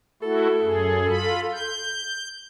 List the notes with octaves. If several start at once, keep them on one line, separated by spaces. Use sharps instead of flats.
A3 E4 F#4 A4
F#2 G#4
F4 B5
G6